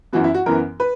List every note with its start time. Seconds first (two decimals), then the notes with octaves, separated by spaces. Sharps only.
0.13 F#2 E3 B3 F#4
0.24 E4
0.34 F#4
0.46 F#2 E3 B3 A#4
0.80 B4